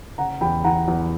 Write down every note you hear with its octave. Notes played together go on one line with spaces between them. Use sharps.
C#3 F#5 A#5
E2 G5 B5
E3 F#5 A#5
E2